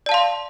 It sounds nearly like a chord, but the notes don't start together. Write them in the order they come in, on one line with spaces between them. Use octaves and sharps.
D5 A5 F5 C6